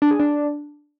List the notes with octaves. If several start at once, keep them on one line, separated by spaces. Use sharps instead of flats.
D4
G#4
D4